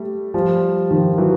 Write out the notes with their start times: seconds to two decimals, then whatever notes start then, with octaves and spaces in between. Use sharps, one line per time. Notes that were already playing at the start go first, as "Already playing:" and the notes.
Already playing: G3 A3
0.34 F3 G3
0.90 D#3 F3
1.18 E3 F#3